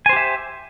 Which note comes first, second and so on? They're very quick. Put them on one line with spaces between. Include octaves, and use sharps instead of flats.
G#5 C5 G4 E5